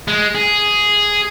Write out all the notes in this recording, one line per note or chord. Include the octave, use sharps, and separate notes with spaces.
G#3
G#4